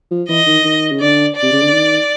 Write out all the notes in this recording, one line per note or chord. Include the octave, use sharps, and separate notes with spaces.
F3
E3 D#5
D#3
D#3
C#3
D3 D5
D5
C3
C#3
D3
D#3